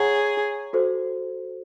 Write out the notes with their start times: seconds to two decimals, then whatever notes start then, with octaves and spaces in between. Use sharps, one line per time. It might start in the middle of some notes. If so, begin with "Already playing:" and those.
Already playing: G#4 C#5 F#5 A#5 C#6
0.73 F#4 A4 C5